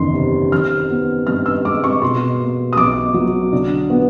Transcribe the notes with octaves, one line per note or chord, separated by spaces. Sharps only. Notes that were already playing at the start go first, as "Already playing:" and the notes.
Already playing: F#1 E2 D#3 C6
C3
D#3 F6
B3
G2 F6
E6
G#3 D6
C#6
B2 C6
A#3
D#6
B1 D6
F#3
D3
B3